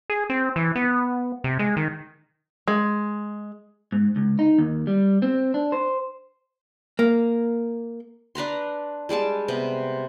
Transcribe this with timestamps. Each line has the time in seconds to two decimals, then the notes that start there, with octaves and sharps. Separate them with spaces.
0.10 G#4
0.30 C4
0.56 E3
0.76 B3
1.44 C3
1.59 G#3
1.77 D#3
2.68 G#3
3.92 G#2
4.16 C#2
4.39 D#4
4.58 D#2
4.87 G3
5.22 C4
5.54 D4
5.72 C5
6.99 A#3
8.35 D4 B4 A#5 C6
9.09 G3 G#3 D5 A5
9.48 C3 B3